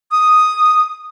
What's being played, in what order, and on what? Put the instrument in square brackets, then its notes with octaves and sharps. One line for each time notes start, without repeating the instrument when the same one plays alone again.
[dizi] D#6